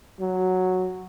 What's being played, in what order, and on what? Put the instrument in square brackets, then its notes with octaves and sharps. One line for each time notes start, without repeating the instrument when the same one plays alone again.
[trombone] F#3